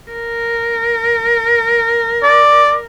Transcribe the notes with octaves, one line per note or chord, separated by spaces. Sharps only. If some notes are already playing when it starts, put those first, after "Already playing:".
A#4
D5